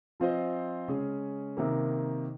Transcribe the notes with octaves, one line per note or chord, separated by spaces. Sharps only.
F3 C4 F4 C5 D#5
C#3 G#3 C#4 G#4
C3 D#3 A#3